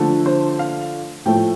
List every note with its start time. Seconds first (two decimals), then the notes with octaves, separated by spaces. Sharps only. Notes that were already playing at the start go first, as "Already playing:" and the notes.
Already playing: D3 F3 A3 A4
0.26 C5
0.59 F5
1.26 A2 F3 A3 G5